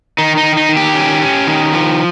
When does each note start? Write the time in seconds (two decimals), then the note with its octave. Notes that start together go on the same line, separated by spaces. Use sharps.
0.18 D#3 D#4
0.38 D#4
0.43 D#3
0.57 D#4
0.69 D#3
0.77 G4
0.95 C#4
1.22 C#4
1.47 D#3
1.73 F3